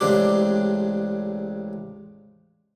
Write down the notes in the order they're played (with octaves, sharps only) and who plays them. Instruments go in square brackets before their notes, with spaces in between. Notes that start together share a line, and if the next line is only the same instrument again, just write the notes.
[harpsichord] A1 C#3 G#3 C4 D4 G4